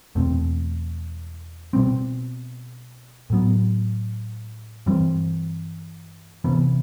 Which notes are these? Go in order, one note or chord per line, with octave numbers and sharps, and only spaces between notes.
E2 B2 A3 C4
B2 G3 C4
A2 F#3 B3
G2 E3 G3 C4
C3 E3 B3